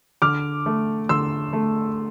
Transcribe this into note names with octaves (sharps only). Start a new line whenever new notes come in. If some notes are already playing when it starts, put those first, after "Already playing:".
D3 D6 F6
A3
D3 C6 E6
A3